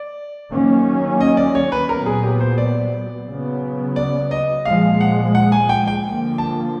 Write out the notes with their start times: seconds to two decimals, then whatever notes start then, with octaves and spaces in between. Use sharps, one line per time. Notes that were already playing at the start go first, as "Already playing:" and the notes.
Already playing: D5
0.51 D#3 F#3 A#3 C#4
1.21 D#5
1.37 D5
1.55 C#5
1.72 B4
1.89 A#2 F#3 B3 A#4
2.06 G#4
2.23 G4
2.40 C5
2.58 D5
3.27 C#3 F#3 B3
3.96 D5
4.31 D#5
4.65 A#2 F3 G#3 F5
5.01 F#5
5.35 F#5
5.52 G#5
5.69 G5
5.88 G5
6.05 D3 F3 A#3
6.38 A5